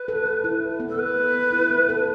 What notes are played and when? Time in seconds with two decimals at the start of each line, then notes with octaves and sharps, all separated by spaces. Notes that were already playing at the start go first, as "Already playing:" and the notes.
Already playing: B4
0.08 A4
0.26 A4
0.44 E4
0.62 A4
0.80 B3
0.88 A4
0.98 B3 B4
1.17 A4
1.35 B3
1.52 E4
1.71 B3
1.89 A4